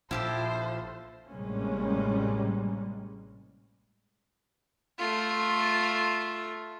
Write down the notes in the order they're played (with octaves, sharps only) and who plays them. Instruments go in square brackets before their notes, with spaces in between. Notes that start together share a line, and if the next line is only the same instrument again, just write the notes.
[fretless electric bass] A#1 A#2 D4 [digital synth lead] F3 [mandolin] E4 G4 A4 [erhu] C5
[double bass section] A1 C3 G3 G#3 A#3 C#4
[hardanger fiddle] A3 F4